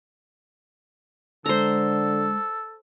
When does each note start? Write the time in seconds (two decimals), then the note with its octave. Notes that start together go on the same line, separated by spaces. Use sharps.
1.46 D3 G#3 A4 C5 A#5